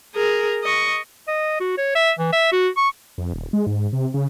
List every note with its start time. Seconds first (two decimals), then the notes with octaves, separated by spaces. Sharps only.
0.15 G#4 A#4
0.63 D#5 C#6
1.28 D#5
1.60 F#4
1.77 C#5
1.95 E5
2.18 E3
2.32 E5
2.52 F#4
2.77 C#6
3.18 F2
3.33 D#1
3.53 G#3
3.67 G#2
3.93 C3
4.14 C#3